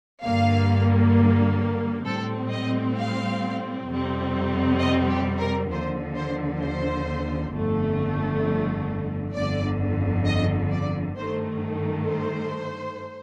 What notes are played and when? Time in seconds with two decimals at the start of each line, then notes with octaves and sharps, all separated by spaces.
0.23 G2 D3 G3 A#3 F5
2.05 A2 G3 C4 A4
2.50 D#5
2.96 F5
3.87 F2 C3 G3 C4
4.79 D#5
5.09 G4
5.39 A#4
5.69 D#2 D3 F3 C5
6.16 C5
6.61 C5
7.52 G1 F2 D3 A3
9.34 G1 F2 D3 D5
10.25 D#5
10.71 D5
11.16 G2 D#3 A3 C5
12.08 C5